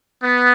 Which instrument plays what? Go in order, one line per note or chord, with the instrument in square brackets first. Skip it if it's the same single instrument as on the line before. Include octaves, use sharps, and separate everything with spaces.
[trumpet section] B3